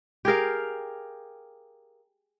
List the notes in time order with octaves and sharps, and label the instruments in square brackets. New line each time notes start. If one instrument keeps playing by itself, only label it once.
[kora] G4 G#4 A#4 F5